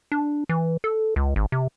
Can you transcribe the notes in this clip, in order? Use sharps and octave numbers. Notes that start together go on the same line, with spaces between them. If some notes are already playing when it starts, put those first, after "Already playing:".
D4
E3
A4
C#2
G#1
C3